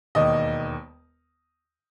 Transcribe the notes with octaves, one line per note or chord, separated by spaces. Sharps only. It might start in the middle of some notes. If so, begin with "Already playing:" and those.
E1 D#2 D#3 D#5